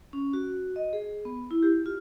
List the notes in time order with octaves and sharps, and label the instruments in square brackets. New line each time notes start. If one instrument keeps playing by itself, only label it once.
[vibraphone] C#4
F#4
D#5
G#4
B3
E4
G4
F4